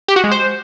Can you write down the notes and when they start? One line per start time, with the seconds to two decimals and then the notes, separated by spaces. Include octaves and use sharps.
0.08 G4
0.16 F#4
0.24 G#3
0.31 C5